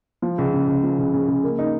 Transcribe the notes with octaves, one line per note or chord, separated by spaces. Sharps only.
F3
C#2
C#3
C#2
F3
C#2
C#3
C#2
A#3
D#4